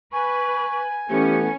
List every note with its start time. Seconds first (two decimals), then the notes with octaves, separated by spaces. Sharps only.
0.12 B4 G#5 C#6
1.09 E3 A3 B3 C#4 G4